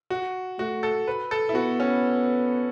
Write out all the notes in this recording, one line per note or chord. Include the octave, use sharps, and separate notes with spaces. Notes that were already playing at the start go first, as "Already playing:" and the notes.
F#4
A3 F#4
A4
B4
A4
E4
B3 F#4
C#4